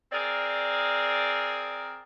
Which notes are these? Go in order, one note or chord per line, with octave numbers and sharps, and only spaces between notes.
C4 G#4 A#4 D5